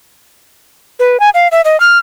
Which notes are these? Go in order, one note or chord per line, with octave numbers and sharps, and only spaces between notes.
B4
G#5
F5
E5
D#5
F6